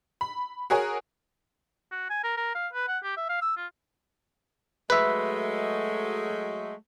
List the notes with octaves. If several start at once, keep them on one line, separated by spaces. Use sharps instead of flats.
B5
F#4 G#4 A#4 C#5 G#5
F#4
G#5
A#4
A#4
F5
B4
F#5
G4
E5
F5
E6
F4
F#3 G#3 A3 B4 E5